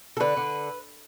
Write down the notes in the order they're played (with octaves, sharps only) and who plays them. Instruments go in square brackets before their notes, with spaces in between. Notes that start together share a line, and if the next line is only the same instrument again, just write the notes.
[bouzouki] A4
D3 B4
D3